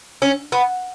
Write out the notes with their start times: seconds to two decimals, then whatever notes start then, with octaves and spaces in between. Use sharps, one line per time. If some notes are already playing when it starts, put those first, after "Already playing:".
0.22 C#4
0.52 B3